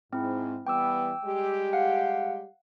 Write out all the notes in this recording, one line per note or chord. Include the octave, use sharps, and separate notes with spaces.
G#2 C4 E4
E3 G3 B3 G5 D6 E6
G3 G#3 G4
F5 F#5